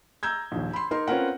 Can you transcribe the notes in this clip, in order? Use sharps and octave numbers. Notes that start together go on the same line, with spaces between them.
A#5 E6 G6 G#6
A#1 D#2
B5 C6
D#4 A#4 C6
C4 C#4 F4 A#4 B4 F#5